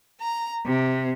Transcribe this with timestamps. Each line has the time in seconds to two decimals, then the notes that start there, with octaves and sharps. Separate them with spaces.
0.21 A#5
0.65 C3